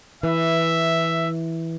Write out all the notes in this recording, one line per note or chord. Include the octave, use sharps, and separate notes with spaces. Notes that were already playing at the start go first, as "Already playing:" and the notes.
E3 E5